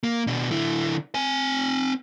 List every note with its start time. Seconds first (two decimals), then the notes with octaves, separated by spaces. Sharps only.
0.03 A#3
0.27 B2 D4
0.51 D3 E4
1.15 C4 G#5